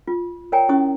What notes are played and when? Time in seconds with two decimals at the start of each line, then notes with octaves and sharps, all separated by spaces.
0.08 F4
0.52 A#4 C#5 D5 G5 G#5 A#5
0.69 C#4 E4 C#6 D#6